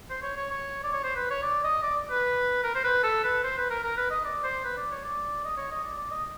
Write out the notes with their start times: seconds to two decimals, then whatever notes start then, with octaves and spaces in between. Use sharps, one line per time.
0.10 C5
0.22 C#5
0.37 C#5
0.50 C#5
0.84 D5
0.93 C#5
1.04 C5
1.16 B4
1.30 C#5
1.43 D5
1.64 D#5
1.83 D5
2.11 B4
2.64 A#4
2.75 C5
2.84 B4
3.03 A4
3.24 B4
3.44 C5
3.58 B4
3.70 A#4
3.84 A#4
3.97 B4
4.11 D#5
4.25 D5
4.44 C5
4.65 B4
4.78 D5
4.92 C#5
5.05 D5
5.45 D#5
5.57 C#5
5.72 D#5
5.84 D5
5.98 D5
6.11 D#5